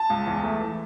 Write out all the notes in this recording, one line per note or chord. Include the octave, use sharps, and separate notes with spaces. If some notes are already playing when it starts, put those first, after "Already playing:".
Already playing: A5
C#2
E2
A3
E3